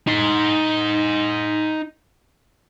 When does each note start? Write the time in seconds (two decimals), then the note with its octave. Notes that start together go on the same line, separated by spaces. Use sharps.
0.07 D#4 C6